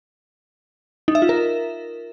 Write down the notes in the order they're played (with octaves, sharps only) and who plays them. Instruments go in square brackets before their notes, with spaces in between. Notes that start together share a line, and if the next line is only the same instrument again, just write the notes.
[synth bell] D#4
E5
F4
A#4